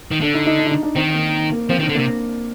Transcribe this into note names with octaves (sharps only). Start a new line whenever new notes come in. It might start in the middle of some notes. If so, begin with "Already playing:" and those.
D#3
D3 D4
D#4
D#4
D4
D#4
D4
D4
D#3 C4
A#3
A#3
F3 C4
D#3
D4
D3
C3 A#3